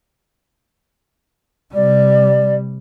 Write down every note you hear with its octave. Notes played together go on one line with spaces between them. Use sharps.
C3 G3 D5